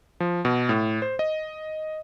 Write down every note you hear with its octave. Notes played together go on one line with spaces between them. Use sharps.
F3
B2
A2
C5
D#5